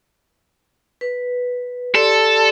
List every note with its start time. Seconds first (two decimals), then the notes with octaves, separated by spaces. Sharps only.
1.01 B4
1.95 G4 A4 D5 C6